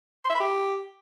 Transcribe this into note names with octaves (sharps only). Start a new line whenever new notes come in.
C6
E5
B5
G4